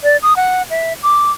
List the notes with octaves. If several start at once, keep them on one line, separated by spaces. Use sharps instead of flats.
D5
D#6
F#5
E5
D6